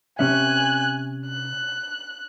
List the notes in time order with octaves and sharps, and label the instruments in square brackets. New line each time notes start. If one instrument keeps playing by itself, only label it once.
[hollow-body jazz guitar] C3 C#4 E5 [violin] G#5 F#6
[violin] F#6